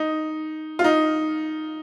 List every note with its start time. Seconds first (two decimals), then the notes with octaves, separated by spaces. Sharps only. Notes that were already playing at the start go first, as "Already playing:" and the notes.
Already playing: D#4
0.79 F4
0.84 D#4